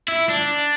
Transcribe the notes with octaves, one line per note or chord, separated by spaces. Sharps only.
E4
D4